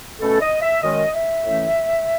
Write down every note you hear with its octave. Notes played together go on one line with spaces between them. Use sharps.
B2 A3 C#4 A4
D#5
E5
F#2 D#3 G#3 C#4 D#5
E5
A2 E3 A3 C#4